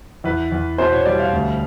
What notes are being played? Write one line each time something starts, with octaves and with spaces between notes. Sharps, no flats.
E2 B4
E2
B2 C5
C#5
G3 D5
F5
D2